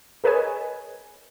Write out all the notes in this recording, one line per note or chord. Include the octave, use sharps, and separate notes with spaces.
G#4 A#4 B4 C#5 D#5 G#5